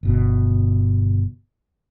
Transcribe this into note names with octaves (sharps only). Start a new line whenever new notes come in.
G1 B2